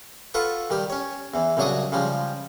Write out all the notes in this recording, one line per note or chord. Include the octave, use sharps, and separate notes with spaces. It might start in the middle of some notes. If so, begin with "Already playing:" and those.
F4 A4 B4 F#5 C#6
D#3 G3 G4
C#4 C#5
E2 E3
C2 C#3 F#3 D4 C#6 D#6
C#3 F3 G3 G#3